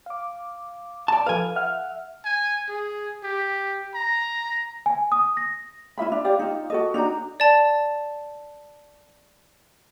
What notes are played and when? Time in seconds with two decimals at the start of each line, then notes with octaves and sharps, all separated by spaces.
0.06 F5 D6
1.08 D5 A5
1.26 F3 A4 B4 F5 G#5
1.56 E5 F#5 F6
2.25 G#5
2.69 G#4
3.24 G4
3.94 A#5
4.86 G#5
5.12 D#6
5.37 A#6
5.98 E4 F4 E5 B5
6.12 D4
6.24 G4 D5 F5
6.39 D#4 F4
6.70 F#4 A4 D#5
6.94 D4 D#4 F#4 A#5
7.40 D5 A5